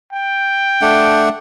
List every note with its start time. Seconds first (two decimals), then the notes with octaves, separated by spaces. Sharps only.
0.12 G5
0.81 A3 D4 F#5